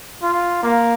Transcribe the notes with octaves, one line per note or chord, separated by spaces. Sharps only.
F4
A#3